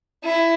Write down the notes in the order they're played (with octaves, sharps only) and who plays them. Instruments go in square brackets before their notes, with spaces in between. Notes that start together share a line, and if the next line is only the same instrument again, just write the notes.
[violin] E4